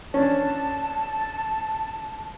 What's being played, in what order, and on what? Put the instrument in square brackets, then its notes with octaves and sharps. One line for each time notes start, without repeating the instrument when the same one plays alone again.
[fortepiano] C#4 D4 [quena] A5